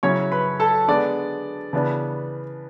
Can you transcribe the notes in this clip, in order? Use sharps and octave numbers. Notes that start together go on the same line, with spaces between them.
C#3 F#3 C#4 E4 C#5 C#6
B4 B5
A4 A5
D3 G#3 B3 D5
C#3 E3 B3 D4